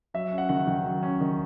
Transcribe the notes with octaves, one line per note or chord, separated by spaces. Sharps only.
F#3 E5
C#4
F#5
D#3 F#5
D#3
F#3
C#4
D#3